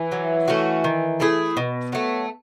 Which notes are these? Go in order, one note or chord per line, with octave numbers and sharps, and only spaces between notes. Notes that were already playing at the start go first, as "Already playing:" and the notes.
Already playing: E3
F#3
A3 C#4 F#4
D#3
A3 E4 G#4
B2 B3
F#3 A3